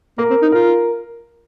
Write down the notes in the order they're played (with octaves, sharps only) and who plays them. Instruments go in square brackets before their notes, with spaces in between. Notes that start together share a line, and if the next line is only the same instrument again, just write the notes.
[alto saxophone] A#3 [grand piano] A#4
[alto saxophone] C4
D#4
[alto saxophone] F4 [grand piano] A#4